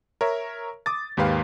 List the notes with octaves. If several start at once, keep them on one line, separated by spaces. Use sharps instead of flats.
A#4 C#5 E5
D6 D#6 A6
D#2 G#2 G4 B4 F5